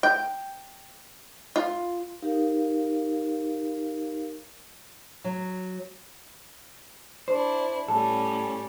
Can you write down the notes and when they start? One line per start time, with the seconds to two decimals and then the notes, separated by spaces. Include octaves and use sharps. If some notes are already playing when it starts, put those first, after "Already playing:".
0.03 G5
1.56 F4
2.22 D#4 G4 A#4 F5
5.24 F#3
7.28 D4 E4 C5
7.88 A2 G3 C#4 A4